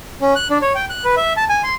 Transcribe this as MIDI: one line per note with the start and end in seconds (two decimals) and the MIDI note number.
0.21 0.34 61
0.35 0.48 90
0.50 0.58 62
0.62 0.73 73
0.75 0.85 79
0.89 1.04 90
1.04 1.15 71
1.17 1.33 76
1.37 1.44 81
1.49 1.62 80
1.63 1.75 84